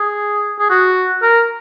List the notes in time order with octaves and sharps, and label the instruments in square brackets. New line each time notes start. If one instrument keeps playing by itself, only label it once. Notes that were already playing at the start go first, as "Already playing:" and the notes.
Already playing: [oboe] G#4
G#4
F#4
A#4